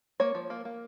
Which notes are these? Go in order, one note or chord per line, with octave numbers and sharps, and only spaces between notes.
A#3 C#5
F3
A#3
A#3